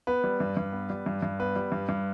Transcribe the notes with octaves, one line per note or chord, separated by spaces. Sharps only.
B3 B4
G3
G2
G2
B3
G3
G2
G2
B3 B4
G3
G2
G2